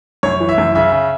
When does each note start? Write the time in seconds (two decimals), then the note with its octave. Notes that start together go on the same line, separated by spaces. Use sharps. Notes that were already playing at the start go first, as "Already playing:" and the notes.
0.23 F#2 C#5
0.40 E3
0.49 E5
0.58 F#2
0.75 C#3 E5
0.92 C#3